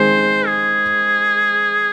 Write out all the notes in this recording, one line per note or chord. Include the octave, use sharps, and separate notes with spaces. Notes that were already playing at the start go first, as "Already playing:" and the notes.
Already playing: D#3 G#3 C4 C5
G#4